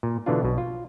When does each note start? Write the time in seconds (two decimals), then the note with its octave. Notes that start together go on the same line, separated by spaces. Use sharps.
0.03 A#2
0.26 B2 D3 E3 D4 F4
0.43 B1 B2
0.58 F4